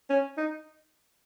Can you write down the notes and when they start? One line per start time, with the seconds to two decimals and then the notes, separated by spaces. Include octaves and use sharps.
0.10 C#4
0.38 D#4